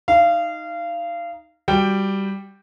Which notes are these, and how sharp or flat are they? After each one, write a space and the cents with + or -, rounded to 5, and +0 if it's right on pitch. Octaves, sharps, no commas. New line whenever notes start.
D#4 +0 F5 -25
G3 +0 F#4 -5 G5 +0